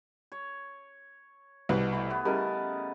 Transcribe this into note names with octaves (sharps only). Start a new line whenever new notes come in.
C#5
C2 B2 B4
E3 A3
B3
C#3 G3 A#4 D#5 A5